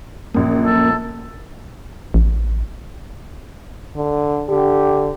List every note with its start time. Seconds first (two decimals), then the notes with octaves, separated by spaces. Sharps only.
0.35 A#1 F#2 A#3
0.65 A4
2.14 A1
3.97 D3
4.49 D3 G4